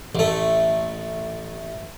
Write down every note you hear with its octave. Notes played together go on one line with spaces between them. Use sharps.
A1 A3